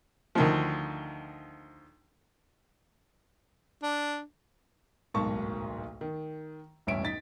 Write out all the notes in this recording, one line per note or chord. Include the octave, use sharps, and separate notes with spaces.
D2 D#3 F3
D4
D1 B1 G#2 A#3 A5 C#6
D#3
E1 A1 G2 C#4 E5 D7
D#4 A6 B6